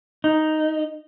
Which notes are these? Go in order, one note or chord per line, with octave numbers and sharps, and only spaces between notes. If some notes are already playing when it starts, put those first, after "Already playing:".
D#4